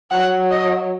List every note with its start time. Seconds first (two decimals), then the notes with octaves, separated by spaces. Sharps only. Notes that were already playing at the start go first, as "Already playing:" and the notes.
0.11 F#3 F#5
0.51 D#5